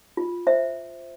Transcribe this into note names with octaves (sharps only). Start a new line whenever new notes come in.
F4
C5 E5